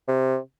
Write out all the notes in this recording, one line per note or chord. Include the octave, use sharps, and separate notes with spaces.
C3